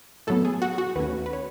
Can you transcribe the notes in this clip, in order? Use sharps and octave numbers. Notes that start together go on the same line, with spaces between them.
A2 F#3 B3 A4
G#4
F#4
F#4
D#2 D#3 A3 C#4 B4
B4
C#5